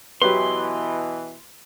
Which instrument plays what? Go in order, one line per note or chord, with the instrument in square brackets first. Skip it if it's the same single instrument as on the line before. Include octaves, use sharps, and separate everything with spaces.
[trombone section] B2 E3 [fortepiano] F#3 G4 B4 [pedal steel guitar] C6